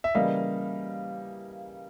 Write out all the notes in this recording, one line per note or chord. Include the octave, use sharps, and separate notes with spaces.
E5
C#3 E3 G3 A#3 D#5 F5